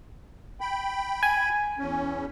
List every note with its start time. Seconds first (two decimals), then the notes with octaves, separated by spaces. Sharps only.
0.61 G5 B5
1.23 G#5
1.79 E2 C#4